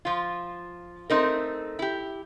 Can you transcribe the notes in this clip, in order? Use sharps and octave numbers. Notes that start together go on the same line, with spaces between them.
F3 F4
A3 C4 D#4 A#4
E4 G4